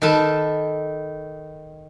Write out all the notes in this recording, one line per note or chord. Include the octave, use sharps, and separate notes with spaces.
D#3 A4 B4 A5